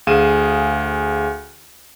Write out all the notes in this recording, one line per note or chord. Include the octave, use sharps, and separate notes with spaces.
D2 G#4 F5 D#7 E7